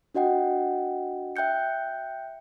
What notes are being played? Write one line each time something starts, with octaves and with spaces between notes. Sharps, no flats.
D4 F#4 D#5 F#5 G5
E5 G5 F#6 G6 C#7